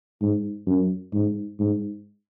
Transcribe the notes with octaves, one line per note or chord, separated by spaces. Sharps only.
G#2
F#2
G#2
G#2